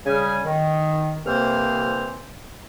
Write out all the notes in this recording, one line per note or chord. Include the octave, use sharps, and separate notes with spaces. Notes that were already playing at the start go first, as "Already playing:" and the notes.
C#3 G3 G#5
D#3
C2 E3 A#3 C4 C5 F6